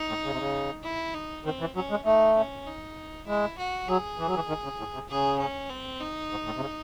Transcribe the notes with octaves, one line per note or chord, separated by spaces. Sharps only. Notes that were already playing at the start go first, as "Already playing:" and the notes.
Already playing: D#4
A2
C#3
C3
C#3
E4
D#4
D#3 C4
E3
F#3 C#4
G#3
A3 D#4
C#4
D#4
G#3 E4
F#4
F#3 G#4
E3
F#3
E3
D#3
C#3
A2
C3
C#3 G#4
C#4
C4
D#4
G#2
A2
C3
C#3